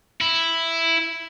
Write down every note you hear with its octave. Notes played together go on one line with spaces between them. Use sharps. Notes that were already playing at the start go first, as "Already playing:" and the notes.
E4